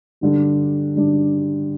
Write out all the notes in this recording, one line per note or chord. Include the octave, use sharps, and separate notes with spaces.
G2 D3 G3 D4
G2 D3 G3 D4